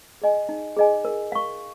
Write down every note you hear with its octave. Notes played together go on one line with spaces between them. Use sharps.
G#4 D#5 G#5
D#4
G#4 D#5 G#5
A#4
F5 C#6